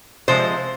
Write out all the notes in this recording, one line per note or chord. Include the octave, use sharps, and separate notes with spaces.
C3 F3 G#3 C5